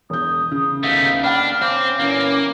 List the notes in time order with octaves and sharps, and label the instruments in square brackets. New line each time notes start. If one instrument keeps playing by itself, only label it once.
[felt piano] E1 G6 [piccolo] D#6
[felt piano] C#3
[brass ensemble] D#2 B3 F5 [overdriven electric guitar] A3 D#4 [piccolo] B6
[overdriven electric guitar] D4 [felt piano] F#5 G5 B5 [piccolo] F6
[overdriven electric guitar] C4 [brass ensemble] C#4 F5 [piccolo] D6
[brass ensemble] A#2 E3 C#4 [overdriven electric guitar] A#3